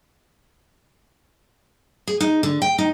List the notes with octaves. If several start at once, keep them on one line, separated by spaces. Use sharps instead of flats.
G#4
D#4
D3
G5
D#4